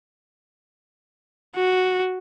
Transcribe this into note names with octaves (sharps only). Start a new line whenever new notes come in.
F#4